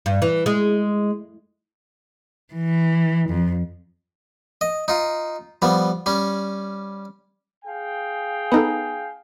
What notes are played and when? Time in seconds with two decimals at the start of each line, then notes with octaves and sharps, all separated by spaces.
0.06 G2
0.22 E3
0.46 G#3
2.54 E3
3.29 F2
4.61 D#5
4.88 D#4 F4
5.62 F3 G3 B3
6.06 G3 C#4
7.65 G#4 F5 G5
8.52 B3 D#4 A4